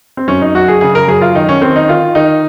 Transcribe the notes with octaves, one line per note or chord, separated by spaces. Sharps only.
C4
F#2 C#4
D#4
F#2 F#4
G#4
C#3 G#4
A#4
F#2 G#4
F4
D#3 D#4
C#4
D#3 C4
D#4
D#3 F4
D#3 D#4